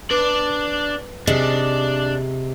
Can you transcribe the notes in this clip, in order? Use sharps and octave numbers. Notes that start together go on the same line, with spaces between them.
D4 B4 D5
C3 D4 G#4 D#5